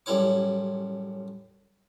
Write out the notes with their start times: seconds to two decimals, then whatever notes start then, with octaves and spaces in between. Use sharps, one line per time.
0.06 A1 F#2 G3 E4 C#5 D6